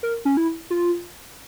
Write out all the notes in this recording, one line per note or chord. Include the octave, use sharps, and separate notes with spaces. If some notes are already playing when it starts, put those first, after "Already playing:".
A#4
C#4
E4
F4